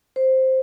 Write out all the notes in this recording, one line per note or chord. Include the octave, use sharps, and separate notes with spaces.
C5